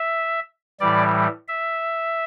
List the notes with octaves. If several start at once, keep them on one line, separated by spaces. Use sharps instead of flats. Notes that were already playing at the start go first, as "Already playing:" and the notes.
Already playing: E5
A2 E3 G3 D5
E5